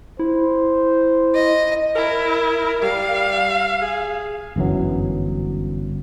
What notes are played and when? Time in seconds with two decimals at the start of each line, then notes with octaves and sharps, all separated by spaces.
0.19 E4 C5
1.35 D#5
1.96 E4 A#4
2.82 G3 F5
3.81 G#4
4.56 G1 F#2 E3 F#3